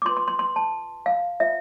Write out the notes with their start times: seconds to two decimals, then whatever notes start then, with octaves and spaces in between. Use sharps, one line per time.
0.02 D6
0.05 F4 C6
0.09 B4
0.17 C6
0.28 C6
0.39 C6
0.56 A5
1.06 F5
1.40 F4 C5 E5